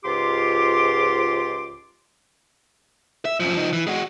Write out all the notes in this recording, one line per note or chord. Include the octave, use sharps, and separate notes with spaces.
C#2 G#2 F4 G4 C6 D6
E5
F#2 F3
F3 D#4
E3
G#3 F#4